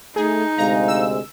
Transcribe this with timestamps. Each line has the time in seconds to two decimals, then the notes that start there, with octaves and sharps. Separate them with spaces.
0.16 A3 D#4 G#4
0.58 D2 C3 G#3 F5 A#5
0.88 E6